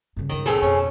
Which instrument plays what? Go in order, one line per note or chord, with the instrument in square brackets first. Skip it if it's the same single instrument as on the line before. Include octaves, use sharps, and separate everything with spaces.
[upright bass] G2 C#3
[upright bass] C#2 G2 [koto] D#3 D#5
[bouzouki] C#3 A4 [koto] F3 C4
[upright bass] F2 B2 [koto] C#4